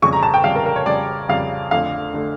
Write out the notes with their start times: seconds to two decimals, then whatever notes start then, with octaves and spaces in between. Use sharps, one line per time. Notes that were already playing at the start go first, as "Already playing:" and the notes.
0.02 F2 C#3 G3 C#6
0.13 A#5
0.23 A5
0.34 G5
0.44 F2 C#3 G3 F5
0.55 A#4
0.66 A#4
0.76 C#5
0.86 F2 C#3 G3 D5
1.29 F2 C#3 G3 F5
1.71 F2 D3 A3 F5
2.14 D3 A3